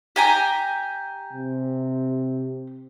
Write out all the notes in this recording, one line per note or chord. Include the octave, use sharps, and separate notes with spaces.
G4 G#5 A#5
C3